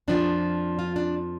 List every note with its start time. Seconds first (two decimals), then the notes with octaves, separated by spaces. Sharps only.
0.08 F2 F3 D4
0.79 F4
0.96 D4